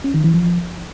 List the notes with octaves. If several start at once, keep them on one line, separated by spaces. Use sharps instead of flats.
C#4
D#3
E3
F3